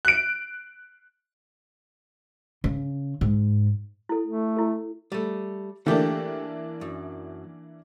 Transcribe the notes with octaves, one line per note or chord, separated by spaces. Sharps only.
F#6 D7
C#3
G#2
E4 A4
A3
E4 A4
G3 A3
E3 A3 A#3 D4 G4
F#2